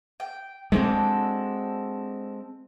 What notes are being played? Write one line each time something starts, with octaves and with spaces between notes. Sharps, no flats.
G5
G#3 A3 C4 D4 F#4 A4